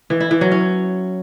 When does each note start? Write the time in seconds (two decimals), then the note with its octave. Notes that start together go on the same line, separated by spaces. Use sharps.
0.10 E3
0.20 E4
0.31 E3
0.41 F#3
0.52 C#4